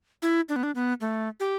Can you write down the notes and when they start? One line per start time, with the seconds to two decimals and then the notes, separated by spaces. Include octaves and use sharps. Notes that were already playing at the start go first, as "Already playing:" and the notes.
0.22 E4
0.49 D4
0.56 B3
0.63 D4
0.75 B3
1.01 A3
1.40 G4